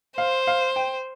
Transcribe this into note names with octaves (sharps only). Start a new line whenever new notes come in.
C5 F5
F5
G5